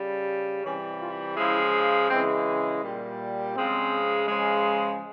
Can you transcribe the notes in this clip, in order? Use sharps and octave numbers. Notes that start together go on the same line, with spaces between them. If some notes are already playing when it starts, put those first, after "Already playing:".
Already playing: C#3 G3
C3 E3 G3 C#4
F4
C#3 F3 G#3 E4
C#3 E3 G#3 C4
A#2 G3
C#3 F3 G#3 C4
C#3 F3 G#3